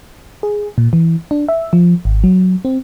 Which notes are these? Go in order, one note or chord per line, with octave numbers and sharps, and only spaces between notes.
G#4
A#2
E3
D4
E5
F3
G#1
F#3
C4